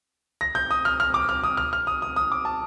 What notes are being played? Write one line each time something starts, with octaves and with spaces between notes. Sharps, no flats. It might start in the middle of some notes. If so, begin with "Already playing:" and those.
A#6
G6
D#6
F6
F6
D6
F6
D#6
F6
F6
D#6
D#6
D#6
D6
A5